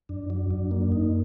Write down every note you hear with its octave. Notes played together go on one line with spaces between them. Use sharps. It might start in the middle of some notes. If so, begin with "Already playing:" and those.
F#2 D4
F#3 D4
F#2 D4
A#3 D4
F#2 D#4